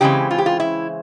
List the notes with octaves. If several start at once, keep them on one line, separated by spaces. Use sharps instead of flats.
C#3 E3 G#3 C4 G4
F4
G4
F4
E4